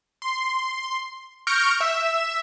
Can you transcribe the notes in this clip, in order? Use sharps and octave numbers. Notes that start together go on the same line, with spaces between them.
C6
C#6 F6 G6 A#6 D7
E5 E7